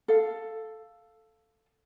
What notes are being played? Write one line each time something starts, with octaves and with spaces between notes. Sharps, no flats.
A4 F5